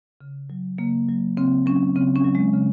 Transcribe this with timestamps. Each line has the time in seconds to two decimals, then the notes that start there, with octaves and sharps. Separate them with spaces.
0.21 C#3
0.50 F#3
0.78 C#3 A#3
1.09 F#3
1.37 C#3 C4
1.66 F#3 C#4
1.96 C#3 C4
2.16 C#4
2.25 F#3
2.35 G#3
2.54 C#3